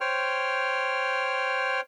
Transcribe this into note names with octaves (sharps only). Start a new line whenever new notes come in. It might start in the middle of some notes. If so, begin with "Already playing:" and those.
C5 C#5 G5 F6